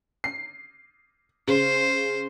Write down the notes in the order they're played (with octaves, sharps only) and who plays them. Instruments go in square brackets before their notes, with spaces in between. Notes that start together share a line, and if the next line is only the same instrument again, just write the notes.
[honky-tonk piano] C7
[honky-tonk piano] C#3 [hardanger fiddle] C5